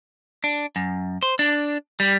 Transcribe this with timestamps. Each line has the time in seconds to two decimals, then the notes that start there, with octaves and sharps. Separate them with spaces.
0.44 D4
0.76 F#2
1.23 C5
1.39 D4
2.00 G3